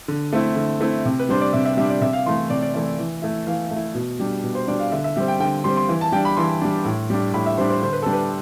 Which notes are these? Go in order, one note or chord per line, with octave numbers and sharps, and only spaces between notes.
D3
A3 C4 E4
D3
A3 C4 E4
C3
B4
G3 D4 C5
D5
C3 E5
E5
G3 D4 E5
D5
C3 E5
F5
E3 A3 E4 C6
C3 D5
D5
E3 A3 E4 D5
E3
A3 E4
E3 F5
A3 E4
B2
G3 D4
B2
C5
G3 D4 D5
F5
D3 E5
E5
G3 C4 E5
G5
D3 G5
G3 C4 C6
C6
E3
A5
G3 D4 G5
B5
E3 C6
G3 D4
A2
G3 D4
A2 B5
E5
G3 D4 C5
C5
D3 C5
B4
G3 D4 A4
B4